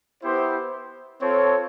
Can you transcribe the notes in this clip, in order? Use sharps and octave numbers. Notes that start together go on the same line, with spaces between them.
B3 E4 G4 C5
C4 F4 A4 C#5